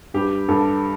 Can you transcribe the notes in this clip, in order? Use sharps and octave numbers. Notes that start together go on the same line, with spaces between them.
G2 G4
G2 A4